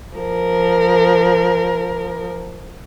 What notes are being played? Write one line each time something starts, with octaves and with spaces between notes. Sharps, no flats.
F3 A#4